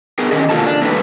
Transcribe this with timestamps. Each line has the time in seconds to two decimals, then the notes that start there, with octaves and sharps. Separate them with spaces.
0.19 B3 G#4 A#4
0.32 D#3 C#4 G4 D#5
0.49 B2 A#3 F4 A4 A5
0.64 D4
0.82 G3 A3 A#3 D#4 A4 B4